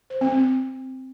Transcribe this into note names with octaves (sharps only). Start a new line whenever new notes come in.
C5
C4
C4